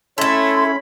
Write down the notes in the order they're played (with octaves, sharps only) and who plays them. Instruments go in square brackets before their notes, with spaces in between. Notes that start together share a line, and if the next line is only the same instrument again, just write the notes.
[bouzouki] A3 A4 [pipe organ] C#4 B5 [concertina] E4 C#5 [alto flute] C6